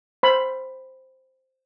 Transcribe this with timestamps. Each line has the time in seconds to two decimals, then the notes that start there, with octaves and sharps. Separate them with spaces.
0.23 C5 B5